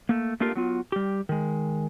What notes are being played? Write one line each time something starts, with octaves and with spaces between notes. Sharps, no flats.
A3 A#3
A3 A#3 D4 F4 G4 A#4
F#3 B3 F4
G3 G4
D#3 G#3